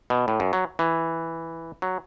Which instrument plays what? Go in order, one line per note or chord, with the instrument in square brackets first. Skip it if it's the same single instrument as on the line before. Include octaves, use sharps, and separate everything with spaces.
[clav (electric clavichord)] B2
A2
F#2
F#3
E3
F#3